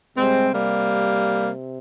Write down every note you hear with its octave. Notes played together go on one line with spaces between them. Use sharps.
C3 G3 G#3 C4
G3 A#3